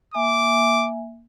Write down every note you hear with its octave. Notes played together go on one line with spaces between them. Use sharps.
A#3 E5 G#5 D6